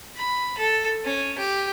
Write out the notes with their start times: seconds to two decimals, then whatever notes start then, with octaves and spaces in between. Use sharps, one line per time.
0.16 B5
0.58 A4
1.05 C#4
1.38 G4